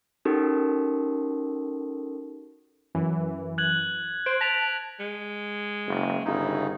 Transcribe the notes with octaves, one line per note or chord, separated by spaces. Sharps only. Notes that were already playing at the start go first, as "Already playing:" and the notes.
C#4 D#4 F#4 G4 A4 A#4
F#2 E3
F#6 G#6 F#7
C5 D7
A5 A#6 B6 F7
G#3
F#1
G1 C#3 D#4 E4